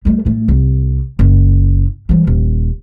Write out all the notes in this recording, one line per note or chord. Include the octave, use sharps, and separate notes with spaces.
G3 A3
A2 A3
C2
F#1
E3 G3
D#1